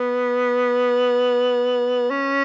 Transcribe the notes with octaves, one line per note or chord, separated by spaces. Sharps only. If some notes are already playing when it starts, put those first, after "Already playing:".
Already playing: B3
C#4